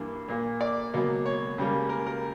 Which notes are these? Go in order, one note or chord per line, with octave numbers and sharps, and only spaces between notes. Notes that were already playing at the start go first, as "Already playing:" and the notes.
Already playing: G2 E3 A#3
A#2 A#3
D5
C#2 B2 F#3 A#3
C#5
C#2 C#3 G3 A#3
A#4
A#4